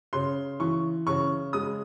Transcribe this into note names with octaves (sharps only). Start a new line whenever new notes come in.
C#3 C6
E3 C#6
C#3 C#6
G#3 D#6